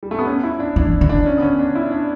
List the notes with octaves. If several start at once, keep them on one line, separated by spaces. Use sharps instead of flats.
G3
A3
B3
C#4
E4
D4
E3 D4
D3
D4
C#4
B3
C#4
D4
E4
D4